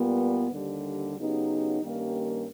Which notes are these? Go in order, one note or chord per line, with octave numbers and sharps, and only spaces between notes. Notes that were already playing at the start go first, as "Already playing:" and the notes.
Already playing: A#2 G3 B3
D#2 D3 G3
C#3 F#3 B3 D#4 G4
G2 D#3 G3 A#3 C#4